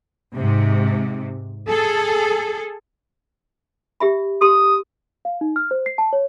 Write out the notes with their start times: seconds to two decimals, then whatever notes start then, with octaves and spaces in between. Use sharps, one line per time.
0.35 G#2 C3
1.68 G#4 A4
4.00 G4 E5 B5
4.41 G4 C6 D#6
5.25 F5
5.41 D#4
5.56 F6
5.71 C5
5.86 C7
5.98 A5
6.13 C#5